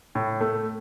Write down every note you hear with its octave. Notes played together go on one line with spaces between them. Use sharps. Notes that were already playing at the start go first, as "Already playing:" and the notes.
A2
A3